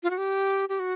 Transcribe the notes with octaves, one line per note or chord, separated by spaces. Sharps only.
F4
F#4
G4
G4
F#4